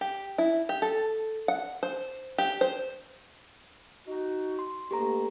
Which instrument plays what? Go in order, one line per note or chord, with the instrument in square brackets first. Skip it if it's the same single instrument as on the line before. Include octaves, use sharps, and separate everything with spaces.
[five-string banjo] G4
E4
G4
A4
F#5
C5
G4
C5
[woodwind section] D#4 F#4
[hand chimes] C6
[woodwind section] G2 A3 A#3 [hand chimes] G4 A4 A#5